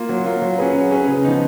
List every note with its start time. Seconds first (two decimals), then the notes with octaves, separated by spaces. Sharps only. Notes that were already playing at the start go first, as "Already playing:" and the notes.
Already playing: A#3 F4
0.09 F#3
0.25 A#3 F4
0.42 F#3
0.58 C#4 G#4 B4
0.74 F#3
0.91 C#4 G#4 B4
1.08 C#3
1.24 F3 B3 D#4